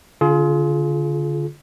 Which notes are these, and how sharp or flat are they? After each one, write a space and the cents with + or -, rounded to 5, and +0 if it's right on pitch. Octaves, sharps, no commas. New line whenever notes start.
D3 -25 F4 +0 G#4 +35